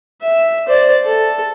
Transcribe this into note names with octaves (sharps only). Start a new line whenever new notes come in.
E5
C5 D5
A4